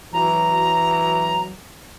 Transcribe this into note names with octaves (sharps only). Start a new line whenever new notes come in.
E3 F#3 A#5